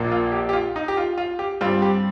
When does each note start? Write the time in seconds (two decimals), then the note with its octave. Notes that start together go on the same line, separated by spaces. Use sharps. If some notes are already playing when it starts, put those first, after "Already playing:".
Already playing: A#1 A#2 A#3
0.11 F4
0.32 G4
0.49 G4
0.53 F4
0.76 D#4
0.88 G4
0.97 F4
1.18 F4
1.39 G4
1.61 G2 G3 C4 F4
1.82 G4